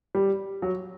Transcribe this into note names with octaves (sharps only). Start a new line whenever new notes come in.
G3
F#3